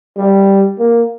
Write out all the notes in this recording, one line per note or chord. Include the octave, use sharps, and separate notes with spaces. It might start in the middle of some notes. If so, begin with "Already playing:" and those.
G3
A#3